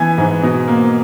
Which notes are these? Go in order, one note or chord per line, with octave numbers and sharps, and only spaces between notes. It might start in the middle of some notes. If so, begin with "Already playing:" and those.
Already playing: E3 B3 G#5
G#2
B2
A#3